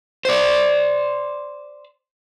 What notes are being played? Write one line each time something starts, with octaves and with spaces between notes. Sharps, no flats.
C5 D5